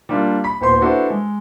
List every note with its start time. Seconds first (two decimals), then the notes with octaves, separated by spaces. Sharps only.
0.09 G3 A#3 D4 F4
0.44 B5 B6
0.61 D#1 B3 C5 C6
0.81 D4 E4 F#4 A4 B4 C5
1.10 G#3